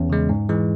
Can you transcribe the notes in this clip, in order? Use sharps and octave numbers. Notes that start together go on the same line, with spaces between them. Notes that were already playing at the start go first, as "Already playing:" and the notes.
Already playing: E2 C#4
C#3 G#3
G#2
E3 G#3